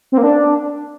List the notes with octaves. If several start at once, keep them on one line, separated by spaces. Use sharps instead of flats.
C4
A#3
D4